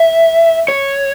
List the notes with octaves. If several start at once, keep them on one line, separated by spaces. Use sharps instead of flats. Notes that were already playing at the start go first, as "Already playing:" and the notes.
Already playing: E5
C#5